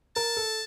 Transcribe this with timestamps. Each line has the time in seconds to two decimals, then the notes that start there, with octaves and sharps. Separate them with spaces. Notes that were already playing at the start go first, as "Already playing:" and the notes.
0.16 A#4 A5
0.37 A4